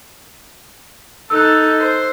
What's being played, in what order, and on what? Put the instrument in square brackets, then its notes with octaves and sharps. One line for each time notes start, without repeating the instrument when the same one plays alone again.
[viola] D#4 A4 [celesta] E6 F#6
[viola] C5